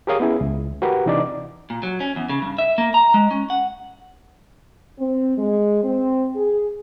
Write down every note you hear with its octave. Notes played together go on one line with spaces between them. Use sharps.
G4 G#4 A#4 C#5 F5 D#6
B3 C#4 E4 G#4
C#2
F#4 G4 A#4 B4 F#5
C3 E3 D4 D#4 D5 D6
A#2
F#3
C#4
E2
C#3
G2
E5
A#3
A#5
G#3
C#4
F#5
C4
G#3
C4
G#4